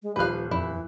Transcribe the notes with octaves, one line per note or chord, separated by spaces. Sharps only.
G#3
D#1 F3 B4 F5 F#6
F2 E3 E4